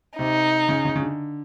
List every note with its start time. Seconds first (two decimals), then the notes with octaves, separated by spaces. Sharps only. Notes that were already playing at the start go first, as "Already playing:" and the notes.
0.19 C3 D#4
0.69 C#3
0.85 C#3
0.96 C#3
1.02 D3